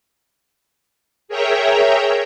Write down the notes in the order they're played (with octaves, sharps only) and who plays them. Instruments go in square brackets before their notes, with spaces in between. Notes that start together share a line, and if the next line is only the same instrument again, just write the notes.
[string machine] G#4 A#4 C#5 E5 G5 A#5